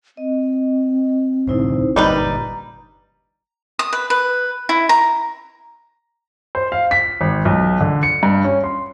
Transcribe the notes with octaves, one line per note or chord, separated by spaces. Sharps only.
C4 D#5
C2 A2 D3 D#4 E4 C5
G1 G2 A#2 G3 D#4 A#4 B4 D5
A#5
D#6
B4
B4
E4
A#5
C5
F5
B6
G#1
B1
D3
C#7
G2
C#4
C6